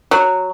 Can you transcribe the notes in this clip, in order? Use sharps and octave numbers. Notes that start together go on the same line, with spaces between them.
F#3